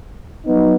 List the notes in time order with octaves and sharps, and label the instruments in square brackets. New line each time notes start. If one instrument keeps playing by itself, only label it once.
[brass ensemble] F#3 B3 D#4